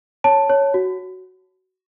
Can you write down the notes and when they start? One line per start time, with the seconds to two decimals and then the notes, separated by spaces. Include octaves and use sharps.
0.24 C#5 A5
0.50 C#5
0.74 F#4